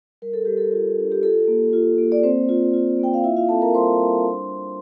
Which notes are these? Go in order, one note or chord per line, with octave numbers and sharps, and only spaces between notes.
G3 A#4
A4
G3 G4
A4
F4
D4
G4
F4 A4
A#3
F4
A#3
D5
A#3 C4 C5
F4
F4
A#3 G5
F5
E4 F4 E5
F4 F5
C4 A4 A5
A#4 A#5
G3 C5 C6
G3
D4
D4